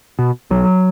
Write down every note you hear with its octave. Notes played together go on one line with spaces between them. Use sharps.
B2
B1 F#3